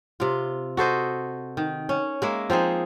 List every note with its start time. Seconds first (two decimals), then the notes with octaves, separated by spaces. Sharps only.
0.20 C3 F4
0.77 F#4 A4 C5 D#5
1.57 D#3
1.89 C#4
2.22 G#3 A#3 E5
2.50 F3 C4 D#4 G#4